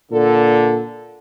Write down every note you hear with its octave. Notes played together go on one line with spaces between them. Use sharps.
A#2 D3 A4